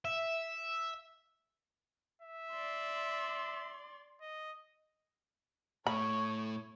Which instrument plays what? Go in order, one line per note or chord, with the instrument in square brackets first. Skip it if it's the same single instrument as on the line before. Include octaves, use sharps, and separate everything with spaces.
[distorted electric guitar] E5
[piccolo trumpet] E5
[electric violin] D5 C6
[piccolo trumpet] D#5
[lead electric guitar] A2 A3 [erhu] C#5 [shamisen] B5